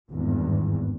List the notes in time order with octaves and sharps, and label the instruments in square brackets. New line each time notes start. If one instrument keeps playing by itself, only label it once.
[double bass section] G#1 E2 G2